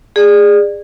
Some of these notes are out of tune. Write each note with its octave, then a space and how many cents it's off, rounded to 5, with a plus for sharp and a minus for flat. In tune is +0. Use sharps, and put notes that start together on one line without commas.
G#4 -20 D5 +20